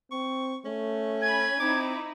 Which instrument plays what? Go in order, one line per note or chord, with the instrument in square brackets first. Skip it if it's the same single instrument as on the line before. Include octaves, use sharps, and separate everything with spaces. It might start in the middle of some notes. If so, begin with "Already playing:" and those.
[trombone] C4 [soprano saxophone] C#6
[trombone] A3 [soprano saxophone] C#4
[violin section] G#5 B5 [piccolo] G#6
[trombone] C4 [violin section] D#4 E4 [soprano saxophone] D6